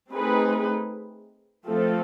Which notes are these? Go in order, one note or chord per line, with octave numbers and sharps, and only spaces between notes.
A3 C4 D#4 G#4 B4
F3 A3 C4 F4 A4